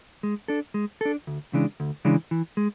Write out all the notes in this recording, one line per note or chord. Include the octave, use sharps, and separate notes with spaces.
G#3
D4 A4
G#3
D4 A4
D2
C#3 E3 G#3 D4
D2
C#3 E3 G#3 D4
E3
G#3